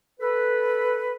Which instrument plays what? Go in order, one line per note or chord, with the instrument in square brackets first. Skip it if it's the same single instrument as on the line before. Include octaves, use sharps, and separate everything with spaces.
[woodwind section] A4 B4